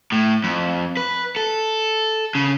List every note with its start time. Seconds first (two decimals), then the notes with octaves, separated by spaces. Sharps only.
0.12 A2
0.44 F2
0.97 B4
1.36 A4
2.35 C#3